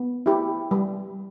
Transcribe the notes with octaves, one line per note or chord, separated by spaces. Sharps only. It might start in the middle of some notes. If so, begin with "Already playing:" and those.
Already playing: B3
E4 G4
G3